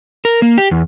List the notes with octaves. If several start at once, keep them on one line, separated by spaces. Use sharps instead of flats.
A#4
A#3
G4
E2